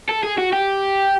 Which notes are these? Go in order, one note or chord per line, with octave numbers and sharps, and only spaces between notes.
A4
G#4
F#4
G4